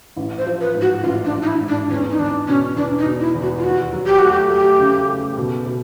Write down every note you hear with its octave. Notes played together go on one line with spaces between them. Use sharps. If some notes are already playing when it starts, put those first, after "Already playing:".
A1
C5
F3
B4
G#2
F#4
A1 F4
D4
A1
D#4
E4
G#2
D4
E2 C#4
D#4
E2 D4
B2 C#4
E2 D4
D#4
B2
E4
E2
F#4
F4
D#2 F#4
F#3
G4
A3 F#4
G4
A3 G4
C#3
A3
B2
B2